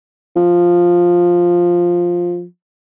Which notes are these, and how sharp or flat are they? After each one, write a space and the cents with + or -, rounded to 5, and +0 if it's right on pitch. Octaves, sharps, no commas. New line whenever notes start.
F3 +5